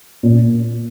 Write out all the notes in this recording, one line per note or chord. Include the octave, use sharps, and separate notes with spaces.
A#2